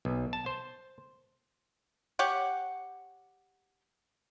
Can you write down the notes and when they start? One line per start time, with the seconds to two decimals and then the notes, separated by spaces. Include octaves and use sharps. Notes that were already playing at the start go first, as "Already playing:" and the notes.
0.05 B1
0.33 A5
0.46 C5
2.19 G4 C#5 F#5